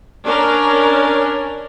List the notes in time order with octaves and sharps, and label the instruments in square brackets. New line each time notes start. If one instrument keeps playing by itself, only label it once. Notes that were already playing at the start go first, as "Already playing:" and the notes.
[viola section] C#4 D4 A#4